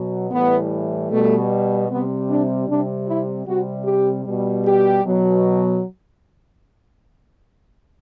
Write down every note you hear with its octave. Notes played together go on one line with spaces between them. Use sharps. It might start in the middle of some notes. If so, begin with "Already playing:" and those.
Already playing: B2 F#3
A2 E3 G3 B3
B2 G3 A3
C3 G3 B3
D4
C3 G3 D4
E4
C3 G3 F#4
G4
B2 G3
G4
B2 F#3